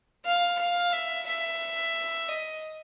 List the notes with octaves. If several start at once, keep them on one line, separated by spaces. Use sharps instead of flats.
F5
F5
E5
E5
D#5